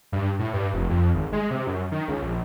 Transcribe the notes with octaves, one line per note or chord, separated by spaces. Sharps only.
G2
A2
G2
F1
F2
G#1
G#3
C3
F#2
D#3
C#2
A#1